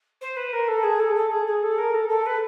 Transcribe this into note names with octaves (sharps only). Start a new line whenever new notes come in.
C5
B4
A#4
A4
G#4
A4
A4
G#4
G#4
A4
A#4
A4
A4
B4